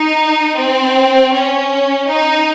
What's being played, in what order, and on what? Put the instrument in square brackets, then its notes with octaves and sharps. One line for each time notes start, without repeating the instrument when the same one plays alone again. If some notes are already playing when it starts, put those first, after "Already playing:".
Already playing: [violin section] D#4
C4
C#4
D#4